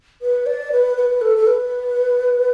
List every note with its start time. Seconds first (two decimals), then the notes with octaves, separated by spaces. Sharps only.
0.22 B4
0.46 D5
0.72 B4
0.97 B4
1.10 B4
1.21 A4
1.37 A4
1.47 B4